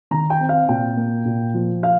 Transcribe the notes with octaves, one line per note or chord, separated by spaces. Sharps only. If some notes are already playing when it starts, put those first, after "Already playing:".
D#3 A#5
G5
C4
F5
A#2 G5
A#3
A#2
F3
F4 F5